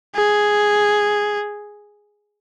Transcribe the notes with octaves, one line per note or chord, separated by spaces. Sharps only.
G#4